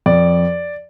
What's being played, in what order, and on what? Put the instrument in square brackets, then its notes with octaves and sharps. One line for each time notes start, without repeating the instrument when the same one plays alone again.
[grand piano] F2 D5